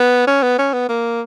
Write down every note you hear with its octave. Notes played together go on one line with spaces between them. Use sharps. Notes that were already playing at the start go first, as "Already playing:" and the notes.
Already playing: B3
C#4
B3
C#4
B3
A#3